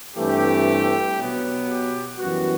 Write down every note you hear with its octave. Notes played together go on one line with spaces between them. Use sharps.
G2 E3 A3 C4 G4
B2 F#3 B3
G4
F#2 E3 G3 B3 F#4